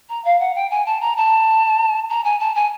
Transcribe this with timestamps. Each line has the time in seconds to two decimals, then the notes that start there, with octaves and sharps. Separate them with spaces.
0.09 A#5
0.25 F5
0.40 F#5
0.55 G5
0.71 G#5
0.86 A5
1.01 A#5
1.17 A5
2.10 A#5
2.24 G#5
2.40 A5
2.55 G#5